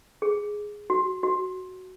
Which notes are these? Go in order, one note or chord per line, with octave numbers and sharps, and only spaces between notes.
G#4
F#4
F#4